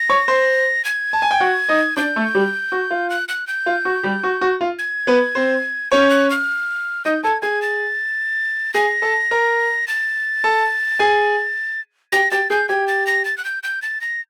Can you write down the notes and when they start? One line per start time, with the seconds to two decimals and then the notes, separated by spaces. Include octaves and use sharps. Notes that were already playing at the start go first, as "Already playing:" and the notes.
Already playing: A#6
0.10 C#5 C#6
0.28 C5 C6
0.85 G#6
1.13 A5
1.22 G#5
1.31 G5
1.40 F#4 F#5
1.69 D#4 D#5
1.97 D4 D5 G6
2.16 A3 A4
2.35 G3 G4
2.72 F#4
2.91 F4
3.10 F#6
3.29 F#6
3.47 G6
3.66 F4
3.85 F#4
4.03 G3 G4
4.23 F#4
4.41 F#4
4.61 F4
4.79 G#6
5.07 B3 B4
5.35 C4 C5
5.92 C#4 C#5 G6
6.10 F#6
6.30 F6
7.05 D#4 D#5 G6
7.24 A4 A5 G#6
7.42 G#4 G#5 G#6
7.62 A6
8.74 G#4 G#5 A#6
9.02 A4 A5
9.31 A#4 A#5
9.88 A6
10.44 A4 A5
10.99 G#4 G#5
12.12 G4 G5 A#6
12.31 G4 G5 A6
12.50 G#4 G#5 G6
12.69 G4 G5 G#6
12.88 A6
13.07 A#6
13.25 A6
13.38 F#6
13.45 G6
13.63 G6
13.82 A6
14.01 A#6